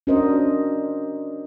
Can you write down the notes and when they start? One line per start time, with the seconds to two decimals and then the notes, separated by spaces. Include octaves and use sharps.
0.07 C#4 D4 F#4 A#4 C5 D#5